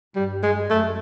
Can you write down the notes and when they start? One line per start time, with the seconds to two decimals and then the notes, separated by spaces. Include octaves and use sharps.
0.16 G2 G3
0.43 G#3
0.70 F#2 A3